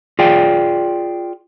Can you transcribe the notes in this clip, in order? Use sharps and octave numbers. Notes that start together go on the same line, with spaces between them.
F4 G#4 D5 G5